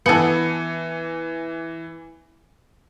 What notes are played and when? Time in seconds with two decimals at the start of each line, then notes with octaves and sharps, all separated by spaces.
0.06 E3 B3 A4 G#5 C#7